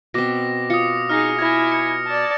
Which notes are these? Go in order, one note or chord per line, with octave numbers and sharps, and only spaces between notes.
B2 C4 D6 A#6
F4 D#6 C#7
D#4 G#4 F6 A#6
E4 G#5 G#6
C#7
D5 A5